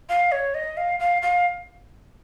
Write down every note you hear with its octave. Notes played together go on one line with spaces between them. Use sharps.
F5
C#5
D#5
F5
F5
F5